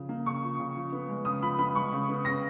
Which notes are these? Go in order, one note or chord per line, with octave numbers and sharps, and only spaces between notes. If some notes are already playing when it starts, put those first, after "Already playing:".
Already playing: C#3 F3
A#3
C#3 C#6
F3
C#3
F3
B3
G#3
C#3 D#6
F3 B5
B3 B5
G#3 C#6
C#3
B3
C#3 A#6